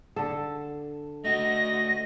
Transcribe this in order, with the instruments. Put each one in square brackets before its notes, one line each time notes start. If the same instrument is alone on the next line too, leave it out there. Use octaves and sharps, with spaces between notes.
[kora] D3 A4
[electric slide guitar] A3 F#4 [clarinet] D#5 [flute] A#6